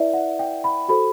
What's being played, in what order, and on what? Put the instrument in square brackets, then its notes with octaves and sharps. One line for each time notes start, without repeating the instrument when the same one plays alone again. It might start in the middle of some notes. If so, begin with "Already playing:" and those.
Already playing: [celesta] E4 B4 D5 E5
F#5
G5
B5
F#4 A4 C5 B5